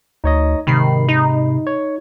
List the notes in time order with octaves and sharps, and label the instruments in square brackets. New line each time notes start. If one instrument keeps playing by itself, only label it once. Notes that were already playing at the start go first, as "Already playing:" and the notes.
[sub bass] D2 [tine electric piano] D#4 C#5 D#5
[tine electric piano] G#2 B5 C7 [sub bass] C3 [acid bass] D#3
[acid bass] D#4
[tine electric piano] C#5